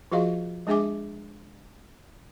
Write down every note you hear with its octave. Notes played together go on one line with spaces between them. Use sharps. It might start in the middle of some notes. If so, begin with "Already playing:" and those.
F3 F4 F#4 G#4 D#5 F5
G#3 D4 G#4 E5 G#5 D6